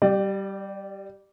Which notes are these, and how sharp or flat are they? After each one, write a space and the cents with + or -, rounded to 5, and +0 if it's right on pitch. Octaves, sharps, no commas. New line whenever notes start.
G3 -10 D5 +30